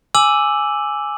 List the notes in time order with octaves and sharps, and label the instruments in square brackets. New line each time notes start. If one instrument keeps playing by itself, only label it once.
[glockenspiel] G#5 D6 E6 D#7 F#7